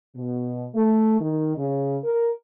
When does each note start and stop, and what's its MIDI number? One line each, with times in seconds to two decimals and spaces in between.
0.17 0.67 47
0.75 1.21 57
1.21 1.57 51
1.57 1.98 49
2.04 2.30 70